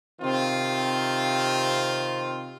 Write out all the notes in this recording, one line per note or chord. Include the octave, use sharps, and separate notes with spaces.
C3 D#3 C4 F4